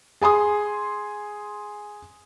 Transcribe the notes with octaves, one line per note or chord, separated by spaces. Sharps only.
G#4 G#5 C6 D#6